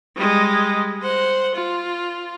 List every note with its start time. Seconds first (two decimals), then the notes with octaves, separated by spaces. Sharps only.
0.16 G3 G#3
1.02 C5 F#5
1.55 F4